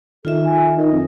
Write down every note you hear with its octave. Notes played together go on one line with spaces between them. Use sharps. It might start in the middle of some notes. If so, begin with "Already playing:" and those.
D#3 D#4 F4 A4 E5
G#5
A4
D#3 D#5
F2